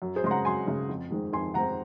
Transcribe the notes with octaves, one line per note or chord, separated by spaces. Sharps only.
F#2
G#4 C5
C#3 G#3 C6
F#5 A#5
F#2 G#5 C6
C#3 G#3
F2
D#3 G#3 C4
F2 G#5 C6
D#3 G#3 C4 F#5 A#5